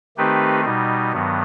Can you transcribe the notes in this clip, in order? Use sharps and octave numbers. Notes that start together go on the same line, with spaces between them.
D#3 A3 C4 D#4 G4 B4
B2 G3 D#4
G2 D#3 F#3 B3